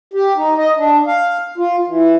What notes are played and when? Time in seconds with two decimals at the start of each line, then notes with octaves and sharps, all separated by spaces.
0.14 G4
0.37 D#4
0.57 D#5
0.77 D4
1.07 F5
1.58 F4
1.87 E3